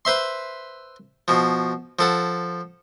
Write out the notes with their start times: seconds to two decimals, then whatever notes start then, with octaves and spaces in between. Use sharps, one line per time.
0.05 B4 C5 E5 C6
1.28 B2 F3
1.99 F3 A4 F#5